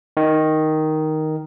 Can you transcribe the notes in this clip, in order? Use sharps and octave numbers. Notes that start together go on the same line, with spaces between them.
D#3